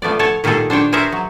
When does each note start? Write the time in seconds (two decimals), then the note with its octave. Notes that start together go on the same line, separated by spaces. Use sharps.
0.02 F3 A3 B3 D5
0.19 A4 C#5 F#5 G#5 A5
0.44 A#2 D#3 G3 G#4 A4
0.70 D4 C5 C#5 G5
0.92 G#4 A#4 C5 C#5 E5 A5
1.12 F#3